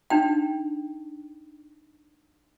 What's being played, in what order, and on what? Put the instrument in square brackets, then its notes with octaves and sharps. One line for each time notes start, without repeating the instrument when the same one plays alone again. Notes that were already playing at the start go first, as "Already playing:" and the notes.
[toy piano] D4 D#4 G5